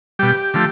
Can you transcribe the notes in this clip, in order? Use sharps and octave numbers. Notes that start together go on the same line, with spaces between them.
B2 G3 G4
D3 F3 A3